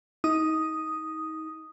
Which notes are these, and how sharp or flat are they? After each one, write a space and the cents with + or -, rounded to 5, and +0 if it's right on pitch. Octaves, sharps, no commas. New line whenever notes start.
D#4 +30 D#6 +0